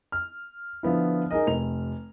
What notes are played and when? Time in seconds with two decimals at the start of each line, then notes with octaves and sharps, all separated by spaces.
0.12 F6
0.83 D3 F3 B3 E4
1.31 D#4 G#4 A#4 D#5
1.47 F1 F7